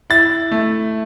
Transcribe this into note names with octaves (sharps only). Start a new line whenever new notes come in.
E4 A6
A3